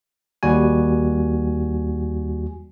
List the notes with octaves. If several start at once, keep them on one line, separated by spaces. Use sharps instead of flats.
D#2 G3 F#4 G#5